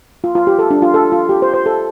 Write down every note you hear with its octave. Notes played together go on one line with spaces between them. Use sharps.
F4
F4
G4
A4
D4
F4
A4
F4
G4
C5
C5
A4